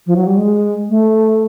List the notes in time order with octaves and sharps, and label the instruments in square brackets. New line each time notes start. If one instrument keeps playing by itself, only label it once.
[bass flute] F3
F#3
G3
G#3
A3